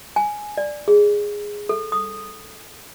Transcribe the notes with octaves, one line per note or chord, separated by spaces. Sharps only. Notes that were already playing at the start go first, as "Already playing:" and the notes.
G#5
D5
G#4
A4
D#6